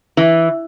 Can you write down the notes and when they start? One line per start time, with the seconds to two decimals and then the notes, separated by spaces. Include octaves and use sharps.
0.17 E3